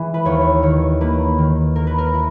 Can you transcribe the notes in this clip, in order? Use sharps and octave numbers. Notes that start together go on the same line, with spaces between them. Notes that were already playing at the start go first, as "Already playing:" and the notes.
Already playing: E3 G#3
B4
D#2 C#5
D#3 C#5
A#3 B4
D#3
A#3 A#4
B4
A#4
E4